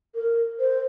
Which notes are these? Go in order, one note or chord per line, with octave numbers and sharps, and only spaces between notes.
A#4
C5